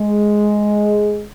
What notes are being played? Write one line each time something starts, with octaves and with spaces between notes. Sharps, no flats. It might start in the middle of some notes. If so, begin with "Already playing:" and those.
Already playing: G#3